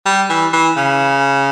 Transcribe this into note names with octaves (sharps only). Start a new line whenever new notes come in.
G3
E3
E3
C#3